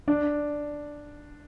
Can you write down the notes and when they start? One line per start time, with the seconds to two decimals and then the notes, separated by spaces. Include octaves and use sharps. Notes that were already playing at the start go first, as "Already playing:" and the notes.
0.08 D4 D5